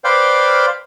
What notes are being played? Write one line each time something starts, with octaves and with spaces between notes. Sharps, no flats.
B4 C5 D5 F5 G5